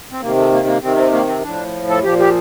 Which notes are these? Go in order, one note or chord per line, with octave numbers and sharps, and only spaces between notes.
C4
C3 D#3 A#3
A3
A#3
A#3
C3 D#3 C4
C4
A#3
C4
A2 F3 D4
A4
A#2 F3 G4
G4